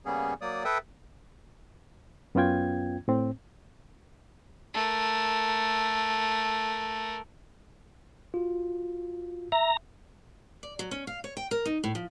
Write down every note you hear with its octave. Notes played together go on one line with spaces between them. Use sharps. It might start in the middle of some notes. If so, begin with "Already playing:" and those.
C#3 G3 A#3 B3 C#4 G#4
F#3 A#3 D5 D#6
A4 B4 E5 G5 D#6
F#2 B3 C#4 F4 G5 G#6
A2 C4
A3 A#4
F4 F#4
E5 A#5
D5
F#3
C#4
F5
C#5
G5
A#4
D#4
A2
F3